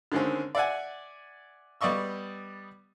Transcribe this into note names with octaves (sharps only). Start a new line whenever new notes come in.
D3 D#3 G#3 C4 C#4
D5 E5 F#5 G#5
G3 B3 D5 D#5 C#6 E6